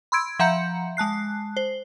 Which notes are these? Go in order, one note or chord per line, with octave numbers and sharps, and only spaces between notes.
B5 C6 E6 G#6 D7
F3 E5 F#5 A#5 G6 C#7
G#3 A5 F#6 C7
C5